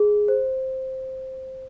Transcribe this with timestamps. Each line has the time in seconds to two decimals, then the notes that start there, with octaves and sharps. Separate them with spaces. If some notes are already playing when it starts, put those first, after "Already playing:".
Already playing: G#4
0.28 C5